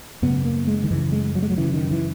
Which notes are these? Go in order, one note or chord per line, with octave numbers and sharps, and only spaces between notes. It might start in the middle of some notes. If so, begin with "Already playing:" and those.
F#2 C#3 B3
A#3
G#3
D#3
F#2 C#3 E3
G#3
F#3
G#3
F#3
F#2 C#3 E3
D#3
E3